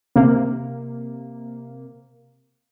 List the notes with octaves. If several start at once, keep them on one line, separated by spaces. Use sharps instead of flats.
C3 A#3